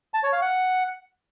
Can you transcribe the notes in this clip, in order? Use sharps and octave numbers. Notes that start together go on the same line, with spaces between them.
A5
C#5
F5
F#5